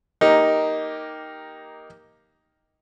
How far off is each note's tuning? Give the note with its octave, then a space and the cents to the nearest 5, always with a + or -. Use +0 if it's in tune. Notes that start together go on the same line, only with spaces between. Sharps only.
A#3 +0 D#4 +5 G4 +0